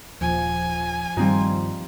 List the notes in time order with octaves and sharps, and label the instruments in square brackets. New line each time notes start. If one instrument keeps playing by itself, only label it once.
[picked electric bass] D#1 [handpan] F3 [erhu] G#5
[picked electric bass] G2 D#3 [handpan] F3 F4 [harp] G3 C4 D#4